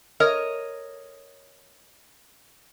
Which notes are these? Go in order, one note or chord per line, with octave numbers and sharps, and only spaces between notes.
A#4 C#5 D#5